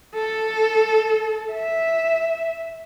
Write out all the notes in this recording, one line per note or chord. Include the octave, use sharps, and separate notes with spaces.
A4
E5